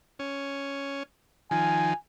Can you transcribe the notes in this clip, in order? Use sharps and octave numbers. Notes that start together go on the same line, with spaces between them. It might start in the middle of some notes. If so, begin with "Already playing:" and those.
C#4
D#3 F3 G#5